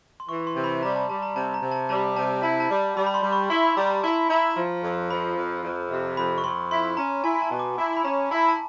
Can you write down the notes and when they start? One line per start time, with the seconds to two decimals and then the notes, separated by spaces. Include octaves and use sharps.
0.20 C6
0.29 E3 C#6
0.47 C6
0.56 C3
0.64 B5
0.82 G3 A#5
0.96 A5
1.09 G3 A5
1.22 A#5
1.36 C3 A5
1.54 A#5
1.62 C3
1.71 A5
1.89 G3 A5
2.16 C3 A5
2.42 E4 A5
2.60 A5
2.70 G3
2.96 G3 B5
3.07 B5
3.14 C6
3.22 G3
3.32 C#6
3.50 E4 C6
3.64 B5
3.77 G3 A#5
3.90 A5
4.03 E4 A5
4.30 E4 A#5
4.57 F3
4.83 F2
5.10 F3 B5
5.37 F2
5.64 F2
5.90 C3
6.17 F2 B5
6.38 C#6
6.44 F2 C6
6.71 E4 C6
6.97 C#4 A#5
7.24 E4 G#5
7.42 A5
7.51 B2
7.59 D6
7.78 E4
7.97 B5
8.04 C#4 A#5
8.31 E4 A5
8.49 A5